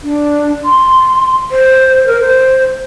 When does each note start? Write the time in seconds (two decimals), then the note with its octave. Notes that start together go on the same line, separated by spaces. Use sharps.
0.03 D4
0.65 C6
1.51 C5
2.07 A#4
2.21 C5